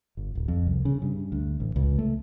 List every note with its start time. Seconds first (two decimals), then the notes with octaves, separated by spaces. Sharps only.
0.17 G1
0.35 D1
0.48 F2
0.67 C2
0.85 C#3
1.02 G2
1.32 D2
1.60 A1
1.76 C#2
1.98 A3